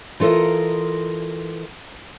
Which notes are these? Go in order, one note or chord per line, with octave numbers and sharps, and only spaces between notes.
E3 F4 A4 A#4 D#5